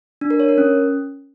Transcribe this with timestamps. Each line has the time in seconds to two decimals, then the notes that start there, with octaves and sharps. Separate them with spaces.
0.21 D4
0.30 A#4
0.40 C#5
0.49 A#4
0.58 C#4